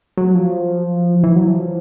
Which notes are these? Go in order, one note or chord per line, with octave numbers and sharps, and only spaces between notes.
F#3
F3
E3
F#3
F3